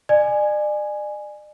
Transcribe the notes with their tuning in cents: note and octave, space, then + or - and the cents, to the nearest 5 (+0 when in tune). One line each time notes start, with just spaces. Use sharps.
D5 +40 G#5 +0